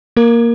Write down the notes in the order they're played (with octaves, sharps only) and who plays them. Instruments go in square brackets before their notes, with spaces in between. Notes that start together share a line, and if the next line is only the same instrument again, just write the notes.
[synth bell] A#3 A#4